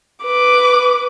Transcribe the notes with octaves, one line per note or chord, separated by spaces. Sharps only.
B4 D6